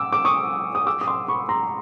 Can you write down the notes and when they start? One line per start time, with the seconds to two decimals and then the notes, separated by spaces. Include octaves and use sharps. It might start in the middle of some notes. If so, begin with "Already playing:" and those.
Already playing: D6 E6
0.12 D6
0.25 C#6 D#6
0.75 D#6
0.87 D6 E6
1.01 D#6
1.07 C6 D6
1.28 B5 C#6
1.49 A#5 C6